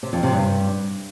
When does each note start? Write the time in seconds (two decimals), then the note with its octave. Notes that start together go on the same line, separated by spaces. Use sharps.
0.03 C3
0.13 F2
0.23 C3
0.33 G2